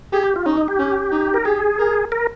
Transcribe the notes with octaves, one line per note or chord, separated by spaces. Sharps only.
G4 G#4
G4
F4
C#4 D#4
D#4
G4
C#4
D#4
A#4
G4 G#4
A#4
A#4